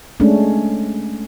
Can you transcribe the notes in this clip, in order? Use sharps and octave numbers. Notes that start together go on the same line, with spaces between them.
G#3 A3 C#4 D4